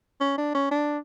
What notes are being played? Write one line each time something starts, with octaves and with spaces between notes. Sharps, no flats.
C#4
D4
C#4
D4